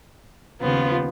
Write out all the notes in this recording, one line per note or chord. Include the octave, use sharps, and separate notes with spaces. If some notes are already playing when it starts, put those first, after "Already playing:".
D#2 C#3 F3 B3 F4